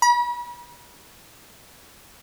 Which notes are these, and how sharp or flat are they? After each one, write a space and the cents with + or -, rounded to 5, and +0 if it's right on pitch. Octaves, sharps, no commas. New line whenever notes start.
B5 -40